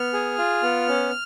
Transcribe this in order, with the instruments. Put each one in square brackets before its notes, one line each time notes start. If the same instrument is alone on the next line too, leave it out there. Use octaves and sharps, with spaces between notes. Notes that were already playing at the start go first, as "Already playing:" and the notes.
Already playing: [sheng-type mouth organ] B3 F6
G#4
F4
B3
C#4